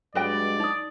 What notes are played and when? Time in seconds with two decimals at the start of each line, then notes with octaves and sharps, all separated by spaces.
0.15 G2 F#3 G#3 B4 D5 D#5 G5
0.60 D#4 D#6